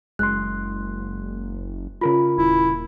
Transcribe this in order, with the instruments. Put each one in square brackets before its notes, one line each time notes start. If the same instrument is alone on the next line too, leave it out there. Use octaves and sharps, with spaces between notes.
[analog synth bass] F#1 [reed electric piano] G#3 C6 [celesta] F#6
[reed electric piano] C#3 A#4 B5 [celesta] F4
[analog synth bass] D#1 [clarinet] E4